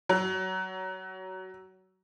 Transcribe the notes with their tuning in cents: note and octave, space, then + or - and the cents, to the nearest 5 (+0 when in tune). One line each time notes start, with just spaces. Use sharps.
F#3 +20